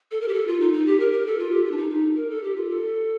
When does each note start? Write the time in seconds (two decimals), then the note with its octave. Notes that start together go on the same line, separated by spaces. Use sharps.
0.11 A4
0.21 A#4
0.28 G4
0.34 A4
0.47 F4
0.60 D#4
0.73 D#4
0.86 G4
1.00 A#4
1.12 A#4
1.26 A4
1.39 F4
1.51 G4
1.65 F4
1.71 D4
1.78 D#4
1.90 D#4
2.16 A#4
2.30 A4
2.43 G4
2.56 F4
2.69 A4